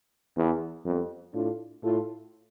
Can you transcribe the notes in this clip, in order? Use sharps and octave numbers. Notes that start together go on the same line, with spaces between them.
E2
F2 G3 B3
A2 D4 F4
A2 F4 A4